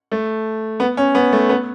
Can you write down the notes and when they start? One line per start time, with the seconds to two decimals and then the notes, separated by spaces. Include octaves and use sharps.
0.12 A3
0.80 B3
0.97 C#4
1.15 B3
1.33 A3
1.49 B3